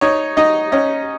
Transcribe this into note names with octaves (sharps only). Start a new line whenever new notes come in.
D#4 C#5
D#4 D#5
C#4 D#5